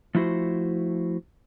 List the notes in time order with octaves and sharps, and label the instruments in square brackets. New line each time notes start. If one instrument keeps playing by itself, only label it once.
[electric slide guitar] F3 A3 E4 F#4 C5